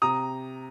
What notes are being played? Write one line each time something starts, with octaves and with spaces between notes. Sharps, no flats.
C3 A#5 D#6